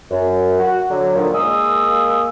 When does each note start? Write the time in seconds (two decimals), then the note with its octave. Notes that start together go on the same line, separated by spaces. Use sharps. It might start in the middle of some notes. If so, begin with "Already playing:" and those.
0.11 F#2
0.60 F#4
0.90 D3 F#3
1.15 A#2 D3 D#3 F3
1.35 G#3 A#3 D#6 E6